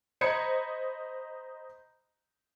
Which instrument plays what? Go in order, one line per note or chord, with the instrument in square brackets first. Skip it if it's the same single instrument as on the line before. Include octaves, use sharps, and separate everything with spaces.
[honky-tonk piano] C5 D#5 A#5 B5 G#6 C#7